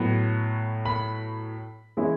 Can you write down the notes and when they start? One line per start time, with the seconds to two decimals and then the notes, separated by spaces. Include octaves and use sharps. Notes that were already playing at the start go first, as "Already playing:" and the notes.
Already playing: A2 F#3 B3
0.85 B5
1.97 E3 G#3 C#4 E4